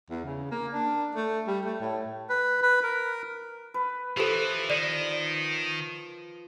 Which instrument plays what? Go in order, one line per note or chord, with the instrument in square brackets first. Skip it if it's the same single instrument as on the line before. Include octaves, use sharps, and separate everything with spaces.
[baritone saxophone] E2
C#3
A#3
D4
A3
G3
A3
A2
[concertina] B4
B4
A#4
[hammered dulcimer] B4
[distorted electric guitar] E3 [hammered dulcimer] F3 [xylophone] G4 A4
[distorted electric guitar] D#3 [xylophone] D5